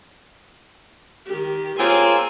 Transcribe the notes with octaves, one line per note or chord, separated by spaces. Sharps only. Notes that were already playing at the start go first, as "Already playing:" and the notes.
D#3 G4
A#3 C4 C#4 F4 G#4 G#5 C6 E6